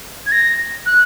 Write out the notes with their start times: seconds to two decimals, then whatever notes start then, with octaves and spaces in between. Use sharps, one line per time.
0.26 G#6
0.32 A#6
0.86 F#6